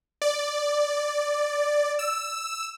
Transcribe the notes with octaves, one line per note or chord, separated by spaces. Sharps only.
D5
E6